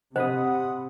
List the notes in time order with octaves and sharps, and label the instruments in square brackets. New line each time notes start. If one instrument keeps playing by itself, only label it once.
[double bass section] C3 [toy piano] C5 D#5 [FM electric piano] F#5 B5 D#6